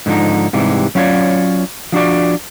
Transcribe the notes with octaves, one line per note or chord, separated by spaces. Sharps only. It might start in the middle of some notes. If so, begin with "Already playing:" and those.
G#2 D3 F3 D#4
G#2 C3 E3 G3
F#3 C#4 F4 B4 C#5 D5
F3 D4 F#4 D5